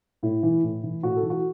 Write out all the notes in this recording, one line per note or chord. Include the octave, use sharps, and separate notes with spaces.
A2 E4
E3
A2
E3
A2 F#4
A4
E3
F#4